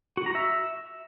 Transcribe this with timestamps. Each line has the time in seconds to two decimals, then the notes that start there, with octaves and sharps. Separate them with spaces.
0.17 F#4
0.26 A#5
0.35 E5